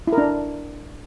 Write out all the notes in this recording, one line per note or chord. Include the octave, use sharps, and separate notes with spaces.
E4
A#4
D4